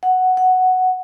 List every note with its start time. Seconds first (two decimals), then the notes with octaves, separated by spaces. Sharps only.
0.03 F#5
0.37 F#5